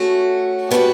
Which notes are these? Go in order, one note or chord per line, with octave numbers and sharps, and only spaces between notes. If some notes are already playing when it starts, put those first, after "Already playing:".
Already playing: A3 C#4 F#4
G3 B3 D4 F#4 B4